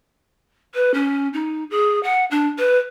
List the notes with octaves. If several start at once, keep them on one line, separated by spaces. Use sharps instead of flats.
B4
C#4
D#4
G#4
F#5
D4
B4